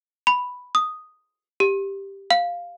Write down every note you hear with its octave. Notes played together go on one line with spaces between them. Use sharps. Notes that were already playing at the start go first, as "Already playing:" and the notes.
B5
D#6
G4
F5